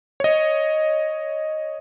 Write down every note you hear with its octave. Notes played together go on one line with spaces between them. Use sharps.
C#5 D#5